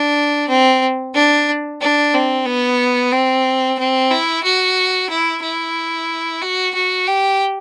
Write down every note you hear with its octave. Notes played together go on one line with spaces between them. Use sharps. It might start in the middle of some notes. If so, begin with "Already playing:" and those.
Already playing: D4
C4
D4
D4
C4
B3
C4
C4
E4
F#4
E4
E4
F#4
F#4
G4